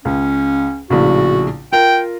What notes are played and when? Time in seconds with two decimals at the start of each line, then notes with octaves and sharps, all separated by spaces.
0.05 C#2 C#4
0.90 A#1 A2 C#3 F#4
1.73 F4 A#4 G5